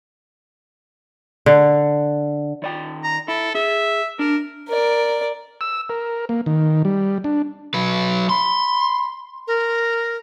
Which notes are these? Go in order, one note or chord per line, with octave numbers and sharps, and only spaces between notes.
D3
D#3 D5 G5
A#5
E4 A4
G#4 E5
D4 A#4
A#4 D5
E6
A#4
A#3
D#3
G3
D4
F#3 B4
B5 C6
A#4